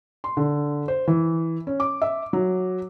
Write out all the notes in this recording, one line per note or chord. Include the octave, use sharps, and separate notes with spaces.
C6
D3
C5
E3
C#4
D6
E5
F#3